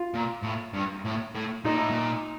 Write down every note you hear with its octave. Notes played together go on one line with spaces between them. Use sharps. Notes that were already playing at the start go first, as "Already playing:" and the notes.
Already playing: F4
A#2
A2
G2
A2
A2
A#2 D#4
A2
A#2